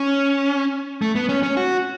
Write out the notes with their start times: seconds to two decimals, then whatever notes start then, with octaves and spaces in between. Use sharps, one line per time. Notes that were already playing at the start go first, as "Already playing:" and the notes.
Already playing: C#4
1.02 A3
1.16 B3
1.29 C#4
1.43 C#4
1.57 F#4